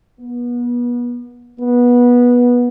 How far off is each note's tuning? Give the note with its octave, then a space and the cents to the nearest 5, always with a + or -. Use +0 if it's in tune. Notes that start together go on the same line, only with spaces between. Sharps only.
B3 -30
B3 -20